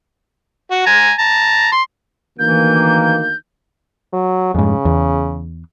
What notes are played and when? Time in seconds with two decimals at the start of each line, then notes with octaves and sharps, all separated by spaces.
0.71 F#4
0.86 G#5 A#5
1.19 A5 A#5
1.72 C6
2.39 D2 D#3 E3 A#3 G6
4.13 F#3
4.55 F2 G#2 C#3
4.85 E2